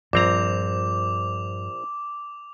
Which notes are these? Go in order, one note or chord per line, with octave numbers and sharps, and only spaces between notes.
A#1 G2 F3 C4 A#5 D6 F7